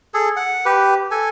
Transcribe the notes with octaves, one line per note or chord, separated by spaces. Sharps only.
G#4 A4
F#5
G4 B4
A4 G#5